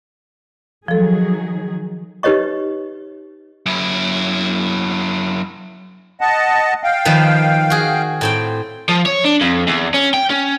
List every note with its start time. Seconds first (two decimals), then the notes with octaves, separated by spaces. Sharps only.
0.88 D#3 F3 F#3 G#4 A4
2.23 D#4 G4 B4 C#5 D#5 C#6
3.66 F#2 E4
6.21 D#5 F#5 A5
6.83 F5 G5
7.05 D#3 F3 B4
7.70 F#4 G#4
8.21 A2 C4 G5
8.89 F3
9.06 C#5
9.24 D4
9.41 F2
9.68 E2
9.94 C#4
10.14 G5
10.30 C#4